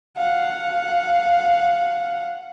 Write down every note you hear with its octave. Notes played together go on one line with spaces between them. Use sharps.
F5 F#5